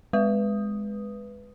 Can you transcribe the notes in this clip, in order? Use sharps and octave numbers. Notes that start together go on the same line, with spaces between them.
G#3 B4 D#6